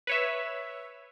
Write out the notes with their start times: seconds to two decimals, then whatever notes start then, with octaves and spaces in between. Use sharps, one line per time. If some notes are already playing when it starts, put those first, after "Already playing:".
0.07 B4 C#5 E5